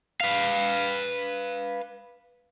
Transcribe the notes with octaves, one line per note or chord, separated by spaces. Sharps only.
B4 F5